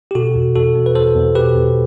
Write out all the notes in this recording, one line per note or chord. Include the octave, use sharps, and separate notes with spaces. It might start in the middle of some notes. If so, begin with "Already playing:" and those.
G4
B2 F#4 A4
E2
E2 F#4 A4
E2
B4
E2 A4 C5
E2
B2 G4 B4
E2